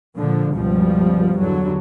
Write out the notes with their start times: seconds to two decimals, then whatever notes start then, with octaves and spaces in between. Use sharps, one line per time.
0.17 A#2 D3 F3
0.52 C#2 G2 B2 F3 G3
1.37 E2 G2 D3 F#3